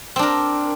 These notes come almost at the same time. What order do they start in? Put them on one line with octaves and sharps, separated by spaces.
C4 D4 A#4